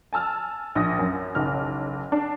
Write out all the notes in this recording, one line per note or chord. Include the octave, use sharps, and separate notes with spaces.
G#5 A5 E6 F6
A#1 D#6 A#6
F#2
F#1 B1 F6
D4